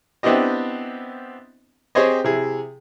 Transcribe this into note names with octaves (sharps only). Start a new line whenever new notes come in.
B3 C4 D4 E4 G4 D#5
C4 G4 G#4 C5 C#5 D#5
C3 E4 G#4